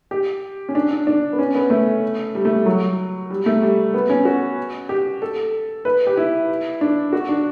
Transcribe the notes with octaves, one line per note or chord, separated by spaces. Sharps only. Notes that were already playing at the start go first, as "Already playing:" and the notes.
G4
C#4
D4
D4
D4
B3
C#4
B3
A3
G3
A3
G3
F#3
G3
A3
G3
B3
C#4
F#4
G4
A4
B4
G4
E4
D4
F#4
D4